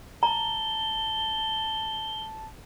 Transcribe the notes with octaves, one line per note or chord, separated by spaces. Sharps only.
A5 A#5 G7